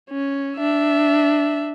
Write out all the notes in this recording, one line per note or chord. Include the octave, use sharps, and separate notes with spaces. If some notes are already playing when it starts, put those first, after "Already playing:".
C#4
D4 E5